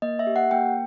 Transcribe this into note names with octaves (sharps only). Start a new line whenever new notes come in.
A#3 D#5
E5
G4
F#5
A#3 G5